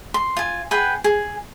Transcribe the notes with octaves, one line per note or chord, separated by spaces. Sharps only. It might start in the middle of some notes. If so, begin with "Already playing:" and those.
C6
F4 G#5
G#4 B4 F#5 G5
G#4